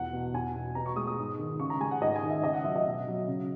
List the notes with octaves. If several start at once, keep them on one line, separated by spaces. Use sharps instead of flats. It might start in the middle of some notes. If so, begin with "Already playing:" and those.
Already playing: E2 B2 F#5
B2
E2 G#5
B2
B2 A#5
C#6
G#3 D#6
D#6
G#2
D#3
C#3 C#6
A#5
G#3 G#5
F#5
G#2 D#5
G#5
D#3
E5
C#3 D#5
F#5
F#3 E5
D#5
B2
F#3
C#3